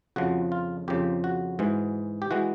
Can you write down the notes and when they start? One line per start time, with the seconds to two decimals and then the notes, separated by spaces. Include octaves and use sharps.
0.16 F2 C#3 F3 F#4
0.52 F4
0.88 F2 C#3 F3 G4
1.24 F#4
1.59 G#2 E3 G#3
2.22 G4
2.31 E3 G#3 F#4